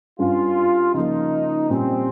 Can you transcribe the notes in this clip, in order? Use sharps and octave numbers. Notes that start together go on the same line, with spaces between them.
G2 G3 C#4 F4
C#3 F3 A#3 D#4
A#2 G3 C4 C#4